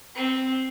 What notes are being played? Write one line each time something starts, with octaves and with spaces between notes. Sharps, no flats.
C4